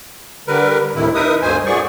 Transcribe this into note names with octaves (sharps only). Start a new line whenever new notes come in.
D3 G3 A#4 B4
D2 A2 C3 D#3 E4
D#4 A#4 B4 E5 D#6
D2 G2 B2 C5 G#5
F#2 A#2 B3 G#4 D5 C#6